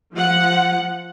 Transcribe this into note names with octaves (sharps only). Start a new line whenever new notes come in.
F3 F#5